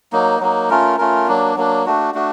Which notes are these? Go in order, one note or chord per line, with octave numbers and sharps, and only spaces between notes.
F#3 A#3 D#4
F#3 A#3 D#4
A3 C#4 F4 A#4
A3 C#4 F4 A#4
F#3 A#3 D4
F#3 A#3 D4
A3 D4 F#4
A3 D4 F#4